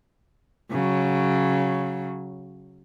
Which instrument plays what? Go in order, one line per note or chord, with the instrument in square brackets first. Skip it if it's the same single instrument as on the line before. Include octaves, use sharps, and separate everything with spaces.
[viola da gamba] C#3 F#3